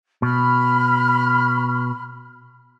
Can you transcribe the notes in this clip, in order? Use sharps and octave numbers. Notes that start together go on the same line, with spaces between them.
B2 B5 F6